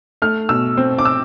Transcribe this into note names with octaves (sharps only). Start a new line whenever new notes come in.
A3 F6
B2 E6
C4
D6
E6